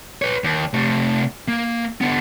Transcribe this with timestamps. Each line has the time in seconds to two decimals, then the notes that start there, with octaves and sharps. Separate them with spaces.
0.22 B4 C#5
0.44 D#2
0.73 C3 A3
1.48 A#3
2.01 D3 B3